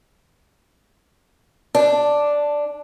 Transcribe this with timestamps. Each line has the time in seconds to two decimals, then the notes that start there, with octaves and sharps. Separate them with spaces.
1.75 D4